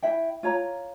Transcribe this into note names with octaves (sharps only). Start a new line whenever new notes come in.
E4 E5 G5
F4 C#5 A#5